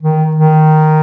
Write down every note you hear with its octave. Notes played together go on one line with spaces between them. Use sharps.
D#3
D#3